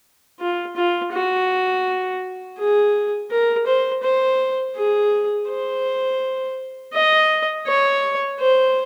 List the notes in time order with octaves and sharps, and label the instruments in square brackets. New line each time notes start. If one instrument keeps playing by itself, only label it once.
[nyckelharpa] F4
F4
F#4
G#4
A#4
C5
C5
G#4
C5
D#5
C#5
C5